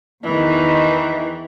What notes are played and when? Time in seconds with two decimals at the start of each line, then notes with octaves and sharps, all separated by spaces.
0.24 E2 D#3 E3